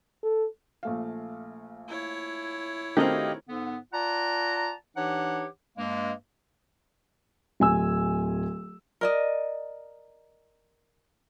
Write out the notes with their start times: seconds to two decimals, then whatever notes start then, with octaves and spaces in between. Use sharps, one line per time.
0.23 A4
0.83 A#1 A3 F5
1.88 E4 C#5
2.97 D#3 A3 C4 D4 F#4 G4 D#5 F5
3.49 G#2 D3 B3
3.93 F4 D5 F#5 A5 A#5
4.97 E3 D4 D#4 G4 C#5 F#5
5.78 G2 G#3 A#3
7.60 D1 G#5 E6
9.01 A#4 D5 D#5